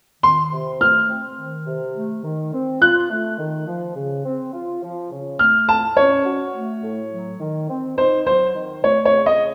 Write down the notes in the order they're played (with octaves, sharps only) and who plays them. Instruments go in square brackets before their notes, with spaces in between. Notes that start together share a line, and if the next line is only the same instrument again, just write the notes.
[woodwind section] D#3 [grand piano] C6
[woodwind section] C3
[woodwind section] A3 [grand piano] F6
[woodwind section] C4
D#3
C3
A3
D#3
C4
[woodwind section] F4 [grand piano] F#6
[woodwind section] A3
D#3
F3
C#3
C4
F4
F3
C#3
[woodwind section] A3 [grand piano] F6
[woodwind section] A2 [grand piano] A5
[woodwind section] C#4 [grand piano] C#5
[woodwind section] F#4
A3
A2
F#3
D#3
C4
[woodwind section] D#4 [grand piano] C5
[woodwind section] F#3 [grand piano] C5
[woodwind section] D#3
[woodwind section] A3 [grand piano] C#5
[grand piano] C#5
[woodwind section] C#3
[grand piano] D#5